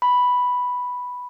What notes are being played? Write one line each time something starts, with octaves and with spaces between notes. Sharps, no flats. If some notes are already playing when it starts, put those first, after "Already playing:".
B5